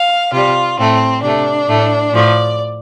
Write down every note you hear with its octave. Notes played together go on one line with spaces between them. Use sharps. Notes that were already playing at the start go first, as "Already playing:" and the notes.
Already playing: F5
C3 G3 F4
A2 A3 C4
C3 A3 D4
A2 A3
A2 F3 A3 D5